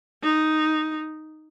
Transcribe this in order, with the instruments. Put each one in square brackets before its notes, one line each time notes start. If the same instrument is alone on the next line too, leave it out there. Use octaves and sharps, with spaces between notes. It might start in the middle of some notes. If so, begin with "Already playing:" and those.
[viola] D#4